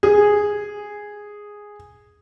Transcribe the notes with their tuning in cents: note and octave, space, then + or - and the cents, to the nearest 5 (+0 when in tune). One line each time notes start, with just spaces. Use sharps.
G#4 -5